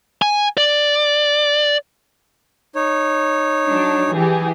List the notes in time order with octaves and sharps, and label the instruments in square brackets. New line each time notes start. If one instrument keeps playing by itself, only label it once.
[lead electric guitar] G#5
D5
[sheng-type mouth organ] D#4 C#5
[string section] F#3 D4
E3 G4 G#4